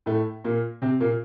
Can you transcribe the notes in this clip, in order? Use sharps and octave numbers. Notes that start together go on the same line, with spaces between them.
A2 A3
A#2 A#3
C3 C4
A#2 A#3